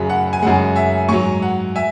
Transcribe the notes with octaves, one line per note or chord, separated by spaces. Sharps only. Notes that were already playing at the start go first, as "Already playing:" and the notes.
Already playing: F#2 C#3 F#3 B5
F#5
G#5
F#2 C#3 G#3 F#5
E5 G#5
G#2 F#3 G#5 C#6
F#5
E5 G#5